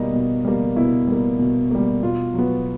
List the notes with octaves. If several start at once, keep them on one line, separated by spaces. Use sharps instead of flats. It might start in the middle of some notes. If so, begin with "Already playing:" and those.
Already playing: B2 G3 A#3 D#4
B2
G3 A#3
B2 E4
G3 A#3
B2
G3 A#3
B2 F4
F#3 B3